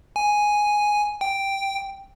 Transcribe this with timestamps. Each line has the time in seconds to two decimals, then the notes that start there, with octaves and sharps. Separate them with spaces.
0.16 G#5
1.21 G5